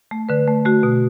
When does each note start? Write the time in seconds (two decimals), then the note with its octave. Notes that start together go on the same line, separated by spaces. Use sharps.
0.11 A3
0.29 D3 B4
0.48 A3
0.65 A3 F#4
0.83 B2